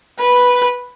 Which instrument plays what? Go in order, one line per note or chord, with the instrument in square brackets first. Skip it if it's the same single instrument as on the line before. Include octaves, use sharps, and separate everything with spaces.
[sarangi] B4